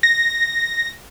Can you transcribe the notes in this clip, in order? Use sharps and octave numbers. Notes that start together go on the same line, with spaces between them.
A#6